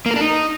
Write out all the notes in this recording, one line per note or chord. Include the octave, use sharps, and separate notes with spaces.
A#3
A#4
D4
D#4